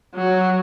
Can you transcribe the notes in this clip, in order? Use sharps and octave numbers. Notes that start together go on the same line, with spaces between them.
F#3